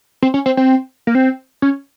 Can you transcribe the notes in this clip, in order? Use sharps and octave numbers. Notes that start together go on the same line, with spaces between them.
C4
C#4
C4
C4
A#3
C4
C#4